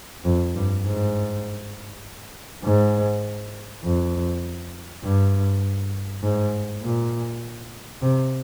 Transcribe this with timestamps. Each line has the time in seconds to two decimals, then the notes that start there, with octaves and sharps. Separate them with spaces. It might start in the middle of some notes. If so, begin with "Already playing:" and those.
0.25 F2
0.55 G2
0.84 G#2
2.64 G#2
3.84 F2
5.03 G2
6.23 G#2
6.82 A#2
8.02 C3